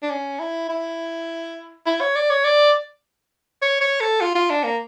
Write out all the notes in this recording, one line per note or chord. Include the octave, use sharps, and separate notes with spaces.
D4
C#4
E4
E4
E4
C#5
D5
C#5
D5
C#5
C#5
A4
F4
F4
D4
A#3